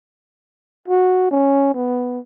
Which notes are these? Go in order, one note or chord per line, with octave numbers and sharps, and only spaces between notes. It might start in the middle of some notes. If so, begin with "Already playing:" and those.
F#4
C#4
B3